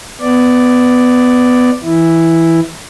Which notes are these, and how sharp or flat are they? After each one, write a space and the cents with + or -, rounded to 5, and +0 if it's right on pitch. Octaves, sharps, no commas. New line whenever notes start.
B3 +15 D5 +0
E3 +0 E4 +0